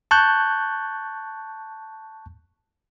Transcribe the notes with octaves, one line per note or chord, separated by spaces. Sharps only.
A5 C#6 F#6 G6